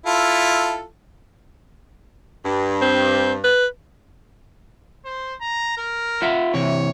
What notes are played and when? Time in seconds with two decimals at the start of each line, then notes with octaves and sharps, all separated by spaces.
0.06 E4 F4 A4
2.45 G2
2.81 C4
3.44 B4
5.05 C5
5.41 A#5
5.78 A#4
6.22 F4 E5 F#5
6.54 C3 E3 C#5